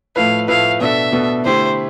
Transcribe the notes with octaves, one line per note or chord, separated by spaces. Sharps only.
A2 F3 A3 E4 B4 F5
A2 F3 A3 E4 B4 F5
B2 B3 D4 A4 E5
B2 B3 D4 A4
D3 A3 E4 G4 C5